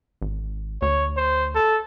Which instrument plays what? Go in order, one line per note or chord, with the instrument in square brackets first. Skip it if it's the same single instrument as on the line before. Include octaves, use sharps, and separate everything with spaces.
[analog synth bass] G#1
[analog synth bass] D2 [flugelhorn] C#5
[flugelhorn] C5
A4